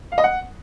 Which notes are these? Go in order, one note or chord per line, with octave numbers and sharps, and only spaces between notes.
F5
D#5
F#5